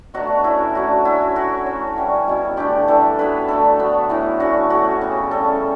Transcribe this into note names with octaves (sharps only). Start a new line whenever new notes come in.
B2 F#3 A3 D4 F#4
A2 F#3 C#4 E4
F#3 A3 D4 F#4
F#3 A3 C#4 E4
F#3 C#4 E4 F#4
F#3 A3 C#4
E3 G3 C#4
B2 F#3 C#4 E4
D3 A3 D4 G4
E3 G3 D4 A4
F#3 B3 E4 B4
D3 A3 E4 A4
F#3 B3 D4
A2 E3 B3 E4
D3 A3 C#4 F#4
A2 F#3 C#4 F#4
C#3 F#3 B3 G4
C#3 G3 C#4 A4